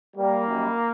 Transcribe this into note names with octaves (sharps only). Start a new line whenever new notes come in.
G3 A#3
F#2 D#3 G3